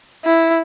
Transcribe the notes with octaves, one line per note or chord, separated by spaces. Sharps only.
E4